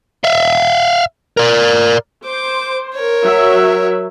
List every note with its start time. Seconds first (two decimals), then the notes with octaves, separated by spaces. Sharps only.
0.24 E5 F5
1.37 A#4 D5
2.26 C5 D6
2.95 A#4 C#5
3.24 F#3 E5